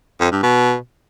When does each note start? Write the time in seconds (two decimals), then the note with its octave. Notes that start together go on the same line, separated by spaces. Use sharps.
0.20 F2
0.31 G2
0.43 B2